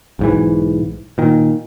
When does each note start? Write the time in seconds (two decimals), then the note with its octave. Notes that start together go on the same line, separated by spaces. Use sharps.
0.19 B1 G#2 E3
1.18 A#2 D#3